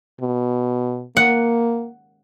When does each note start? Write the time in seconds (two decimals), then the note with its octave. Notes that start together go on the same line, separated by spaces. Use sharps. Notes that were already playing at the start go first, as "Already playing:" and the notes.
0.21 B2
1.17 A#3 F#5